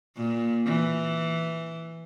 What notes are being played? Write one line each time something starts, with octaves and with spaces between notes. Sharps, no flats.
A#2
E3